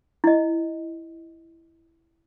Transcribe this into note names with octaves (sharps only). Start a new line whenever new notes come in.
E4 D#5